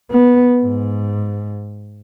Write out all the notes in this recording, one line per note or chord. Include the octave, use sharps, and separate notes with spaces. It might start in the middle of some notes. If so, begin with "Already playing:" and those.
B3
G#2